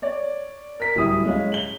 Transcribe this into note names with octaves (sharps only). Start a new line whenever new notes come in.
C#5 D5
A#4 B6
D1 G3 E4 D#6
G#3 C#4 F5
F#7 G7